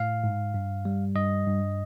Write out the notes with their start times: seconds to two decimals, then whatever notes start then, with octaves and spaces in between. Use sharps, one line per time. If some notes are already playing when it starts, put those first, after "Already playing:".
Already playing: A2 F5
0.24 G#2
0.54 G2
0.85 G3
1.16 G2 D#5
1.47 G2